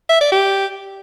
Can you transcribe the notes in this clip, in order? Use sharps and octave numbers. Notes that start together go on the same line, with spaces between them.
E5
D5
G4